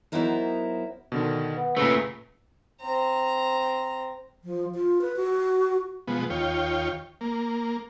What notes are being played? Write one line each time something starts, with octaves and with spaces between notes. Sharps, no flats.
F#3 B3 D#4 E4 A#4 C5
B2 D3 D#3
B3
A#2 C#3 A3 B4
C4 A#5
F3
F4
B4
F#4
B2 F3 G#3 B3
D#2 F4 C#5 G5
A#3